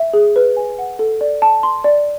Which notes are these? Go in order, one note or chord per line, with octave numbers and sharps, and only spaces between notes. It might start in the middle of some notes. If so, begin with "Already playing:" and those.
Already playing: E5
G#4
B4
G#5
F#5
A4
D5
A5
C6
D5